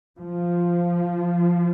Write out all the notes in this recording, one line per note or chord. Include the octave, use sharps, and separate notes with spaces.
F3